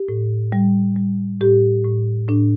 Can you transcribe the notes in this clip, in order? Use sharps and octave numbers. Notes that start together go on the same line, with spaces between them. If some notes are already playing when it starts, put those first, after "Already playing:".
Already playing: G4
A2
G3
G3
A2 G4
A2
A2 D4